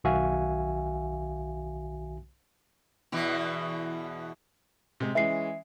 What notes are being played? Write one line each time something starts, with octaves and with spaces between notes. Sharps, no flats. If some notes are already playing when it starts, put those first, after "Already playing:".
B1 D#3 F#4 E5 F5 G#5
E2 B2 E3
C3 G#3
E3 G#3 C#4 E5 C7